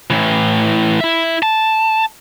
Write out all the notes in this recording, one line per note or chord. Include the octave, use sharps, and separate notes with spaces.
A2 E3
E4 E5
A5